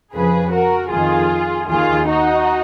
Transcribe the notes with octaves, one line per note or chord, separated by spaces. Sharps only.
F2 C#3 F3 G#4 B4
F#4 A#4
F2 D#3 F4 G#4
D#2 D#3 F4 G#4
D#4 F#4